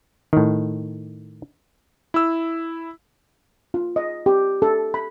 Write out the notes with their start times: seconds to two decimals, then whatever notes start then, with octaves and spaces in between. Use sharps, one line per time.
0.33 A2 D#3
2.14 E4 E6
3.74 F4
3.96 D#5
4.26 G4
4.62 A4
4.94 B5